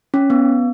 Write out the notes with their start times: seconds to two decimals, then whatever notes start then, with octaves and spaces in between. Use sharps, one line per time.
0.14 C#4
0.30 B3